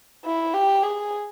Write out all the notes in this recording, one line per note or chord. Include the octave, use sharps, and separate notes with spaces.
E4
G4
G#4